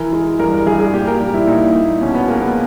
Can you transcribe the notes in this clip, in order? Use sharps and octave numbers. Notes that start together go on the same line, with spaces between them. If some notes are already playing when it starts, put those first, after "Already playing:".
Already playing: E3 A#4
G#3
G2 A#4
A#4
G2 G#4
G#4
A#2 G4
A#4
G3
E4
A#2 D#4
A#2
B2 C#4
B3
G#3 A#3
B3